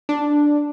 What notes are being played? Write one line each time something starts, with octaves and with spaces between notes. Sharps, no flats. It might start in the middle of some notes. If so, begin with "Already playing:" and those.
D4